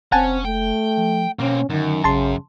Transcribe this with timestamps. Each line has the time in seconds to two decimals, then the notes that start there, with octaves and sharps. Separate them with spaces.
0.12 F1 C4 C#4 F#5 G#5 A5
0.45 A3 G5
0.97 F3
1.39 B2 A#3 C4 C#4
1.70 F#2 D3 D#3
2.04 A1 C#3 A5 C6